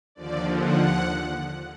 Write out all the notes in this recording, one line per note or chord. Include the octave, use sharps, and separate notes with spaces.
D#2 D3 F3 D5
F#5